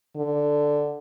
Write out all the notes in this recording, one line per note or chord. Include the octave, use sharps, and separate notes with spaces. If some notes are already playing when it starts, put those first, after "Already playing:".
D3